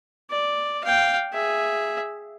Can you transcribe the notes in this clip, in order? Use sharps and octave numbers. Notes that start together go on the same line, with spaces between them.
D5
F5 G5
G#4 E5